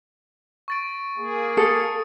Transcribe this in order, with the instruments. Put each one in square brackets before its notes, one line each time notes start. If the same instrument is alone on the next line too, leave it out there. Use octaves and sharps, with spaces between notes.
[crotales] C#6 A6 D7
[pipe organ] A#3 G#4
[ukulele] A4 [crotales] D#6 C#7